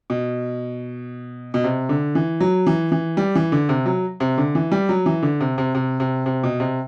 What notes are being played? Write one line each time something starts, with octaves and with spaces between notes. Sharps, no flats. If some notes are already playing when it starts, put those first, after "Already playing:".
B2
B2
C3
D3
E3
F#3
E3
E3
G3
E3
D3
C3
F#3
C3
D3
E3
G3
F#3
E3
D3
C3
C3
C3
C3
C3
B2
C3